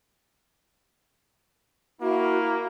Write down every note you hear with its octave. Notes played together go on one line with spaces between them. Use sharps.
A#3 E4 F#4